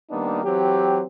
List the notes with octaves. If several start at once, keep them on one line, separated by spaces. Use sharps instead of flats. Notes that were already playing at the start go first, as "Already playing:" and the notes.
D#3 G3 A#3 B3 D4 D#4
E3 F#3 C4 G4